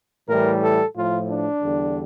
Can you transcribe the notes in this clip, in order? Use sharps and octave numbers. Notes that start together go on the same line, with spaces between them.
A2 E3 G3 A#4
A4
A2 F3 F4
D4
E2 D3 G3